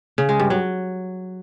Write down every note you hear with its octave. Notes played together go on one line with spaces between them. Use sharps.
C#3
G#3
G2
F#3